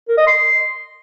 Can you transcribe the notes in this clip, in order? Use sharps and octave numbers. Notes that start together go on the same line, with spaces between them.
A#4
D#5
C6